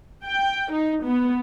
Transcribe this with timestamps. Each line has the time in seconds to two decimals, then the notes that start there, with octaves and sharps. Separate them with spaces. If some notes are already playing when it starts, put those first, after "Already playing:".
0.25 G5
0.72 D#4
1.05 B3